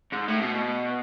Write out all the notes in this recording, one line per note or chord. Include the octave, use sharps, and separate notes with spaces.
G#2
A2
B2